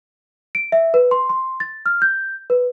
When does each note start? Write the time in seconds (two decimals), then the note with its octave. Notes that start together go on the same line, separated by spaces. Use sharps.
0.55 D7
0.72 E5
0.94 B4
1.11 C6
1.29 C6
1.60 A6
1.86 F6
2.02 G6
2.50 B4